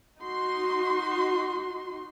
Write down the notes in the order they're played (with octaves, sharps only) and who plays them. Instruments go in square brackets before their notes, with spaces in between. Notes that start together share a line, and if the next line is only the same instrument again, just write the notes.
[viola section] D#4 F#4 C6